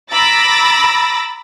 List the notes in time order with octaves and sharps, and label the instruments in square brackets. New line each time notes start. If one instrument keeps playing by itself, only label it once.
[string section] A#5 B5 D6 E6 A6 A#6